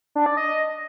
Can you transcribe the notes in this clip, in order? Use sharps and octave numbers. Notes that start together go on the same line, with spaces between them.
D4
D5
D#5